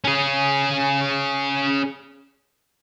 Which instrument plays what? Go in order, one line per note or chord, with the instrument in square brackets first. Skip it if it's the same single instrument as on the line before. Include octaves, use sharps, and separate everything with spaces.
[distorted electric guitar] C#4 G#4